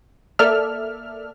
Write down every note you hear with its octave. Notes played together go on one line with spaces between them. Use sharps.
A#3 A4 D5 E5 F6